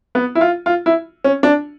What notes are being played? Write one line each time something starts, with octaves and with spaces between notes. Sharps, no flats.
B3
E4
F4
F4
E4
C#4
D4